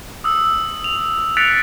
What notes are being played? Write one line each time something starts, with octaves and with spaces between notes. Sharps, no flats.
D#6 E6
F7
F#6 A6 B6 C#7 D7 F7